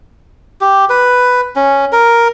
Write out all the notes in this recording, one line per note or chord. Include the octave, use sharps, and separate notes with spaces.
G4
B4
C#4
A#4